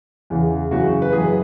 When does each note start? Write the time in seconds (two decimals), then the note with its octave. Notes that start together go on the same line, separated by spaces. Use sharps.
0.30 E2 C#3 E3
0.71 F#2 C#3 E3 F#4
1.02 B4
1.12 F#2 E3 G#4